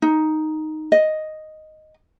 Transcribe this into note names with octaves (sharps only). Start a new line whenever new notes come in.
D#4
D#5